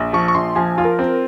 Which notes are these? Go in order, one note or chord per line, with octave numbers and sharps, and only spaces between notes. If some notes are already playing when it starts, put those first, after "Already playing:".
Already playing: A#1
F3 C#6
C#6
A#1 C6
F3 G#5
F4
A#4
C4